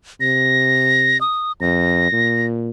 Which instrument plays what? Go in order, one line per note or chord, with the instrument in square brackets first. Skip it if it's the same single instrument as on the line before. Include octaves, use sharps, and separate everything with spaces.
[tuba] C3 [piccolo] A#6
[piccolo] D#6
[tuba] F2 [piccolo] A#6
[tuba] A#2